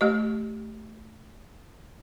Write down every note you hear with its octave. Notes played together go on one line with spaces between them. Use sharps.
A3 G4 D#5